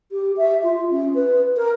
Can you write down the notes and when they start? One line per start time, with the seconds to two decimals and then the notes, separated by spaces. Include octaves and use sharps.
0.11 G4
0.37 E5
0.63 F4
0.90 C#4
1.14 B4
1.56 A#4